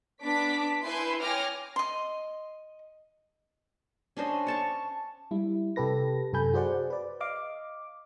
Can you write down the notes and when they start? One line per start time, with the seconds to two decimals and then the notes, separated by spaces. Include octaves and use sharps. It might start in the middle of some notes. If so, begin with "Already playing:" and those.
0.22 B3 D4 D6 B6
0.83 E4 B4 G#5 C6 G6
1.20 C#5 G5 G#5 D6 F6 A#6
1.76 D#5 C6
4.17 C#4 D4 C5 D#5
4.47 C#5 A5 C#6
5.31 G3 E4
5.76 C3 G4 A4 B4 A#6
6.33 F#2 C3 A4 G#5 B5 G6
6.53 F#4 G#4 C5 D5 F#5
6.90 B4 D5
7.20 D#5 F5 D6